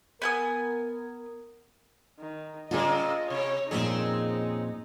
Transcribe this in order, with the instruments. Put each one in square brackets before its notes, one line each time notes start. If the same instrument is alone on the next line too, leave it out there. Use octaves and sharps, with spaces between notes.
[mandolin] B3 G#5 D#6 [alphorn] A#4
[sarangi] D#3
[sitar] C#3 A#3 C4 [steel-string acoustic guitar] F4 G#4 [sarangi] D#5
[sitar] C3 [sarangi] C#5
[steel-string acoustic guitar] F2 A#2 [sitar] C4 C#4 G#4 [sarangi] D#4